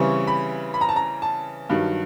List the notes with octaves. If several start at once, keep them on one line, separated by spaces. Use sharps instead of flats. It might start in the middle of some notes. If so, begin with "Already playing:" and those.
Already playing: C#3 E3 G3 C4 C#6
B5
B5
A#5
A5
A#5
A5
G2 D#3 F#3